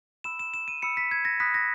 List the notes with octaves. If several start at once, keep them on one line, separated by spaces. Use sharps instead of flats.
B5 E6 E7
E7
E7
D#7
B5 E6 C#7
B6
G#6
A#6
B5 D#6 F#6 B6
A#6